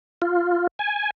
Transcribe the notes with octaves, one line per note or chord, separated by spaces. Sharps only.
F4
G#5